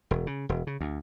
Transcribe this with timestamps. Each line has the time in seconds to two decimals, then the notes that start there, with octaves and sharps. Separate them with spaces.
0.11 E1
0.27 C#3
0.49 E1
0.67 C#3
0.81 D2